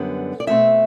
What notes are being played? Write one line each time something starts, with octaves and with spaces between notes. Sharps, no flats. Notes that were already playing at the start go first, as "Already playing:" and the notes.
Already playing: F#2 D3 G3 B3
D5
B2 A3 C4 E5